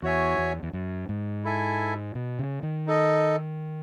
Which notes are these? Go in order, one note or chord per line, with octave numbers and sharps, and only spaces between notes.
E2 F#4 C#5 E5 G#5
E2
E2
F#2
G#2
E4 A4 E5 G#5
B2
C#3
D#3
D#4 A4 D#5